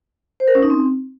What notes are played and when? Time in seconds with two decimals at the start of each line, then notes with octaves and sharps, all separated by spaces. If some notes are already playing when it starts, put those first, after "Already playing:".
0.40 C5
0.48 A#4
0.55 C#4
0.63 D#4
0.70 C4